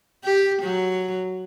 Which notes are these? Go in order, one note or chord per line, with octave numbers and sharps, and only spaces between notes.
G4
F#3